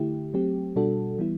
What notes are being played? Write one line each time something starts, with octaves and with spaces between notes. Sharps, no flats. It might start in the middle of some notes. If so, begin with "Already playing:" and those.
Already playing: D3 A3 E4 G4
F#3 A3 C4 G4
B2 G3 D4 F#4 A4
E3 G3 B3 E4